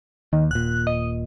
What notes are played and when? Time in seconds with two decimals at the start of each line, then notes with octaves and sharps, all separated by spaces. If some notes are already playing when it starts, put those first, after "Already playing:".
0.33 D#2 D#3
0.51 D#1 A#2 F#6
0.87 D#5